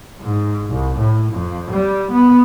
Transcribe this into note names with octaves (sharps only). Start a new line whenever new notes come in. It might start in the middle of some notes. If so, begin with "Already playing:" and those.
G#2
C2
A2
F2
G3
B3